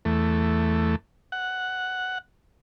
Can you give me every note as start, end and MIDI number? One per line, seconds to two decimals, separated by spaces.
0.05 0.96 40
0.05 0.96 57
1.32 2.18 78